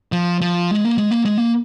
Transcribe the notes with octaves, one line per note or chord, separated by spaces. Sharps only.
F3
F3
G#3
A#3
G#3
A#3
G#3
A#3